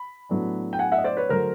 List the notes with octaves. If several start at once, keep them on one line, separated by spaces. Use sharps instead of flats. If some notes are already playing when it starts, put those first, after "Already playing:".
Already playing: B5
A2 F#3 B3 D4
G5
F#5 G#5
E5 F#5
D#5
C5 D5
B4 C#5
D3 F#3 A3 A#4 C5